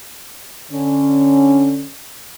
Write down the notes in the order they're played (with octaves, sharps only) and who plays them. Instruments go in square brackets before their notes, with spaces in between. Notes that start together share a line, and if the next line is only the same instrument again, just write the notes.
[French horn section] D3 C#4